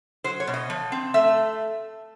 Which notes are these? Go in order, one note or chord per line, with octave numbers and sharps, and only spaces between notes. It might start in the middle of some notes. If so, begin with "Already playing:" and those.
F#3 C5
C#5
B2
D#5
F3
C4
A3 E5